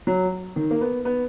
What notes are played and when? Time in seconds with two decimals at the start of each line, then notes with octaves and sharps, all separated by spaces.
0.07 F#3
0.56 D#3
0.71 A#3
0.81 B3
1.05 B3